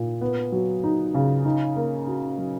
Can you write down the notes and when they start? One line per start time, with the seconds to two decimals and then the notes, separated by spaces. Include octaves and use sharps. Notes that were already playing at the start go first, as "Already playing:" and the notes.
Already playing: A#2
0.21 B3
0.52 F#3
0.83 D#4
1.15 C#3
1.45 D#4
1.76 A#3
2.07 F#4
2.38 F#3